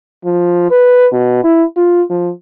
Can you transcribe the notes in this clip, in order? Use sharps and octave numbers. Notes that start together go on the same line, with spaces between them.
F3
B4
B2
E4
F4
F3